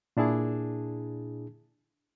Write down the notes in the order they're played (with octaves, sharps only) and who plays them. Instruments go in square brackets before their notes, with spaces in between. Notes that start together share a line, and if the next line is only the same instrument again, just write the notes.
[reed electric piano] A#2 D4 E4 G#4 A5